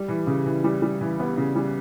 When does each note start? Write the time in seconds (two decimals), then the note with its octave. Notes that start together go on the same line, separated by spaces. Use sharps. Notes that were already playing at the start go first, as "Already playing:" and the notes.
Already playing: G3
0.08 E3
0.27 C#3
0.46 E3
0.64 G3
0.82 G3
1.01 E3
1.19 B3
1.37 C#3
1.56 G3